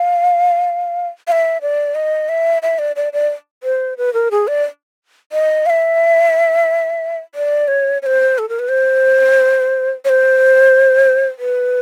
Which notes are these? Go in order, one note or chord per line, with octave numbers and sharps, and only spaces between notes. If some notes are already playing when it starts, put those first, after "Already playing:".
Already playing: F5
F5
E5
D5
D#5
E5
E5
D5
D5
D5
C5
B4
A#4
G#4
D5
D#5
F5
E5
D5
C#5
C#5
C5
A4
A#4
B4
C5
C#5
C5
B4